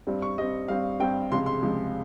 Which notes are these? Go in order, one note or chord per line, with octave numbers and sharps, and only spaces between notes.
G2 G3 C4
C#6
G2 G3 C4 D#5
G2 G3 C4 F5
G2 G3 C4 G5
C#2 C3 F3 G#3 C6
C6
C#2 C3 F3 G#3